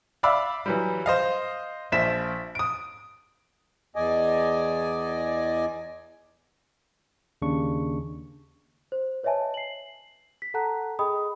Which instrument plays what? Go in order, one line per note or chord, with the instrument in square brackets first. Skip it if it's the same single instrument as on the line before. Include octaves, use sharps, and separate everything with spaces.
[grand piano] D5 E5 F5 B5 D6 E6
E3 F#3 G3
C5 D#5 F5
A#1 F3 E5 B6 E7
D#6 D7
[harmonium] E2 D5 D#5 G#5
[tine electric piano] D#2 C#3 D4 C#6
[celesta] C5
B4 C#5 D#5 E5 G#5 A5
C7 F#7
B6
A4 F#5 A5 A#5 F#6
G#4 D#5 G5 B5 D#6